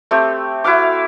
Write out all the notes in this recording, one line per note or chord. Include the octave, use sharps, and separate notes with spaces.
A3 C4 G4
E4 F#4 F5 D6